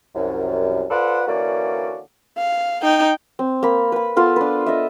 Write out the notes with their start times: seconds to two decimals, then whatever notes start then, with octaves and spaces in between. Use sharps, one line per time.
0.15 C2 F#2
0.90 F4 A4 B4 C5 D5 F#5
1.27 D3 E3 A#3 C#4 F#4 D5
2.37 F5
2.82 D#4 G5
3.39 C4
3.63 A#3 B5
3.92 B4 B5
4.16 B3 F4 A4
4.36 D4 B4
4.66 D#5 E5